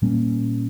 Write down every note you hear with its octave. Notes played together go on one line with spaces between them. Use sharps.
A#2 G3 A#3 C#4